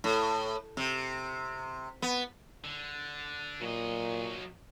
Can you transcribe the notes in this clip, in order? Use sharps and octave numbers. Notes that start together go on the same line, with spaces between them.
A2
C3
B3
D3
A#2 F#3 D#5